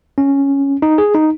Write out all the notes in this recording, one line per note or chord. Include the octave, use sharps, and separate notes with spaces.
C#4
D#4
G#4
D#4